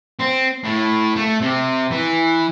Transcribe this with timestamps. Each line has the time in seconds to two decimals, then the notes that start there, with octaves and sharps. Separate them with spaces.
0.19 C4
0.64 A2
1.16 A3
1.41 C3
1.91 E3